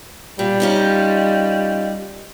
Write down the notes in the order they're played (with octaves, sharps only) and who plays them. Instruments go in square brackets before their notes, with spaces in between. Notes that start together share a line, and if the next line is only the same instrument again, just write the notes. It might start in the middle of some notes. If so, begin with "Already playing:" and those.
[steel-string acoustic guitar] A#2 [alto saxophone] G3
[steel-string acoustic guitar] C#4 D#4 F4